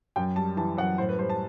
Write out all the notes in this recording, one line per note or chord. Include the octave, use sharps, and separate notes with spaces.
F#2 G5
G3 A5
E3 A5
F#2 F#5
A2 C5
B4
G3 C5
A5